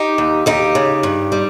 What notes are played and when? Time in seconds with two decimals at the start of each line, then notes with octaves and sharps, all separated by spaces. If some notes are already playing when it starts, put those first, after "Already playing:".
Already playing: D#4 G4
0.18 D#2
0.46 D#2 D#4 G4
0.75 C#3
1.03 G2
1.32 G3